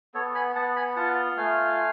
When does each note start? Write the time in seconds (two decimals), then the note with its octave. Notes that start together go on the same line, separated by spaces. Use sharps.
0.14 B3 A4 C#5
0.35 G#5 B5
0.55 B3 F#5 A5
0.76 G#5 B5
0.96 F4 F#5 A5
1.37 A3 F5 G#5